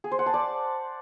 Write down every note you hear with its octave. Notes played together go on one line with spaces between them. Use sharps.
G#4
C5
F#5
A5
D5